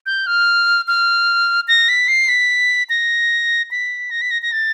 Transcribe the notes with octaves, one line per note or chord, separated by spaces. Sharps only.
G6
F6
F6
A#6
B6
C7
B6
A#6
B6
A#6
B6
A#6
A#6
A6